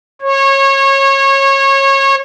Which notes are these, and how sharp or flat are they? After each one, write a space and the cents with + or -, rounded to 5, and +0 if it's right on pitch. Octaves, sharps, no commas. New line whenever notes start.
C#5 -25